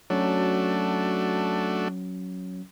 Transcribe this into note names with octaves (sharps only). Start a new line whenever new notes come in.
F#3 A3 C#4 D4 F#4